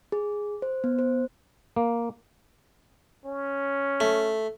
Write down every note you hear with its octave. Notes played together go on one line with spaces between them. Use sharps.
G#4
C5
B3
C5
A#3
C#4
A3